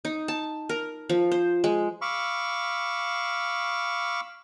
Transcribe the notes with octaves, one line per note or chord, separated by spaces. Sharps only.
D#4
A5
A#4
F3
C5
G#3
F5 B5 C#6 D6 E6